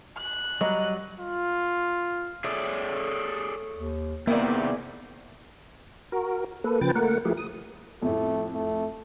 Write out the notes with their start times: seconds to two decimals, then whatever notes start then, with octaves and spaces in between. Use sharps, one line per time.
0.17 F#6
0.61 F#3 G3 D#5 G#5 A#5
1.20 F4
2.44 A3 G#4 A4 C#5 D5
3.76 D#2
4.27 C3 D#3 A#3 B3 E4 G#4 D5
6.12 F#4 A#4
6.64 A#3 A4 B4
6.81 C#3 F3 B4 G5 A6
6.95 A3 A#3 A#4 F#5
7.25 F3 A3 E4 G4 G#4 A#4
7.37 D#6
8.02 F2 A2 A3
8.54 A3